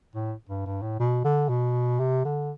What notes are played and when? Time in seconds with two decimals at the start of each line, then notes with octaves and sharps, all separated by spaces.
0.15 A2
0.49 G2
0.66 G2
0.82 A2
0.99 B2
1.24 D3
1.49 B2
2.00 C3
2.25 D3